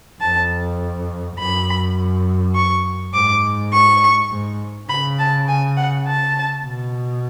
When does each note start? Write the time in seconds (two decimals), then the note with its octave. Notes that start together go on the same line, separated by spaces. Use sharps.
0.20 F2 A5
1.37 F#2 B5
2.55 C#6
3.13 G#2 D6
3.72 C#6
4.31 G#2
4.89 C#3 B5
5.19 A5
5.48 G#5
5.76 F#5
6.06 A5
6.65 B2